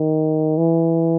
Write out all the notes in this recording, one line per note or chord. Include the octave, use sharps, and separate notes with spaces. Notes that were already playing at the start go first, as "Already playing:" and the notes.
Already playing: D#3
E3